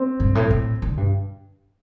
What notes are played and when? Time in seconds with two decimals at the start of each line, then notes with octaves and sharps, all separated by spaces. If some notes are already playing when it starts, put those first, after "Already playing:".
Already playing: C4
0.20 G2
0.35 A2
0.50 A2
0.82 D3
0.97 G2